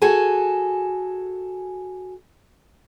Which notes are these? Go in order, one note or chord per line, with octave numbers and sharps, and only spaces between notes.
F#4 G#4 A4 G#5